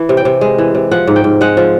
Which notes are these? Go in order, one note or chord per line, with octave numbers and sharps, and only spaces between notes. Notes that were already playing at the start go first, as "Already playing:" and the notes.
Already playing: E3
C3
G5
C3
G#3
E3
C3
F3 F#5
G#2
G5
G#2
G#3 F#5
F3